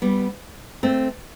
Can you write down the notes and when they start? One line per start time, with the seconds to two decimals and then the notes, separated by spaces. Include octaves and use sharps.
0.02 G3 B3
0.83 A3 C4